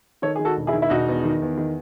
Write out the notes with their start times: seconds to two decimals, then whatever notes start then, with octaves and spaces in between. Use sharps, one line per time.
0.22 D#3 A4 C#5
0.36 D#3 G#4
0.45 F#4 A4
0.56 E1
0.67 E4 G#4
0.73 D#3
0.82 E4
0.90 E1 D#4 F#4
1.08 E2
1.24 D#3
1.42 E2
1.58 D#3